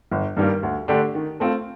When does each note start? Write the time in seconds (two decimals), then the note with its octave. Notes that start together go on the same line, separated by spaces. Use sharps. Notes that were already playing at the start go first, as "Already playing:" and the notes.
0.11 G1
0.37 G2 D#3 G3 A#3
0.63 D2
0.88 D3 A3 D4 G4
1.15 D#3
1.40 A3 C4 F4